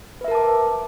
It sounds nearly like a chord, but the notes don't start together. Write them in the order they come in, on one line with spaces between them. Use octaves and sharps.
B4 E5 A#4 A5 D6